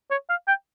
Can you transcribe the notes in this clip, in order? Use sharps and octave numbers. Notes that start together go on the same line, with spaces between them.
C#5
F5
G5